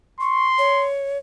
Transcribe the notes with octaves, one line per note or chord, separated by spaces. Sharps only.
C6 C#6
C#5